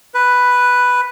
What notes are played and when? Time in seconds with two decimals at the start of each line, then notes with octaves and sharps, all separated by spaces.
0.14 B4